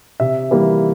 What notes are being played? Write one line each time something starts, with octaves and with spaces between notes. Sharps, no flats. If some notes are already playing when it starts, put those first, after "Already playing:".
C3 E5
E3 G3 A#3